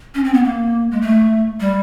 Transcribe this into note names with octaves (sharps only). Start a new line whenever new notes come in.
C#4
C4
B3
A#3
G#3
A3
G3